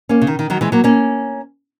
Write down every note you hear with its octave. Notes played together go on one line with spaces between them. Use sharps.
A#3 C#4
C#3
D#3
D#3
D#3 F#3
E3 G#3
F#3 A#3
A#3 C#4